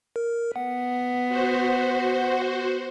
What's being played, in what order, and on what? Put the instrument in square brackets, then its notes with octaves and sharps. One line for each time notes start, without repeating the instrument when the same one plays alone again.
[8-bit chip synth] A#4
[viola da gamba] B3 [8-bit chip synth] F#5
[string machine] F#4 C5